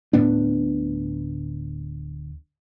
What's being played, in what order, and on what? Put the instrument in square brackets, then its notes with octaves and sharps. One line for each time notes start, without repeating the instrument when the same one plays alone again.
[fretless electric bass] D1 A2 B3 D4